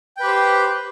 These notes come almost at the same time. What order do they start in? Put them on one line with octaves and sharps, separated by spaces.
G5 B4 G4 C5